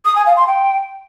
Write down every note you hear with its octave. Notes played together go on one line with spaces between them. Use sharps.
D#6
G#5
F5
C6
G5